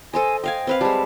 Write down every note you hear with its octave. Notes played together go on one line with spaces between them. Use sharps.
A4 C5 D#5 G#5
D#5 F5 G5 G#5
C4 B4 F5
G3 G#3 A5